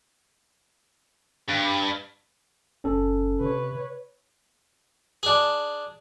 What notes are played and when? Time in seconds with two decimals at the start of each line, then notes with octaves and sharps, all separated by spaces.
1.48 G2
2.84 F#1 C#4 A4
3.40 C3 B4 C#5
5.23 D4 G#4